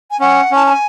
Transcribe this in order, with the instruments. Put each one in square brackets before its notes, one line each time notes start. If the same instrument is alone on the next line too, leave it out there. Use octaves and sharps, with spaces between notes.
[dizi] G#5
[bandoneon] C#4 [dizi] F#5
[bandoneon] C#4 [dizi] A5
[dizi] A5
G#5